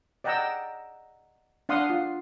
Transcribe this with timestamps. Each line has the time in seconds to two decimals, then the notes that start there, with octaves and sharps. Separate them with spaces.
0.24 D5 D#5 F#5 G5 A#5 E6
1.69 D4 F5 F#5 C6 D#6
1.90 F4